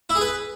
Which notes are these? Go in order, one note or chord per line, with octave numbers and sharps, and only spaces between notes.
E4
G#4
B4